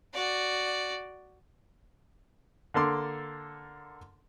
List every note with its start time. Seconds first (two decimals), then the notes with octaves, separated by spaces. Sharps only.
0.14 F#4 D5
2.74 D3 A#3 A4 C6 D6